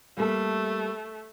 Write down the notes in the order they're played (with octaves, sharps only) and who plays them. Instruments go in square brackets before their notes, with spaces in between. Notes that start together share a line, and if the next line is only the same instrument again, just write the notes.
[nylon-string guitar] G3 A#3 A4 [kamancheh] A3